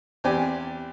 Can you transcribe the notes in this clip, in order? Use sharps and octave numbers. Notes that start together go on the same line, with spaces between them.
E2 C4 G4 D5 G#5